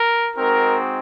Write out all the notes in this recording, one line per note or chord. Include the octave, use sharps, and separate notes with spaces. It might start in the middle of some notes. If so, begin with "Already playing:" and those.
Already playing: A#4
G#3 C4 D#4 F#4 A#4